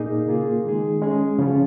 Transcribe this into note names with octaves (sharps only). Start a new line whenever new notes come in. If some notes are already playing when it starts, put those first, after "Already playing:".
Already playing: A#2 A#3 D#4 G#4
C#3 A#3 F4 G#4
D#3 G#3 D#4 G#4
G#3 C#4 G#4
C#3 F3 C#4 F4